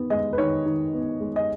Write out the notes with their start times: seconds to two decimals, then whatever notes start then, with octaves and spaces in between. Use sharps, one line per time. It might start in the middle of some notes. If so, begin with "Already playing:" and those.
Already playing: D#3 B3
0.10 G#3 D#5
0.33 B4
0.38 D#3 C#5
0.66 D#3
0.94 B3
1.20 G#3
1.36 D#5